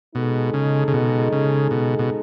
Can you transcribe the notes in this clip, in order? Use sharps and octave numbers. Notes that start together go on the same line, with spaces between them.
B2 G#3 D#4 A4
C#3
C#3
B2
C#3
B2
B2